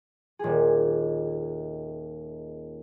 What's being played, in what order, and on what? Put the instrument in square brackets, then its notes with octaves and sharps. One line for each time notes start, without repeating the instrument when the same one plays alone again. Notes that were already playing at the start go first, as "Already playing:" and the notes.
[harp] D#1 G#4